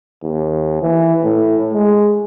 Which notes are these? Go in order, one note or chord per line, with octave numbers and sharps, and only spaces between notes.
D#2
E3
A2
G#3